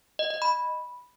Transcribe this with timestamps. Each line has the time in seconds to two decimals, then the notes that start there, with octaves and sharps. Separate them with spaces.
0.19 D#5
0.30 D#5
0.42 B5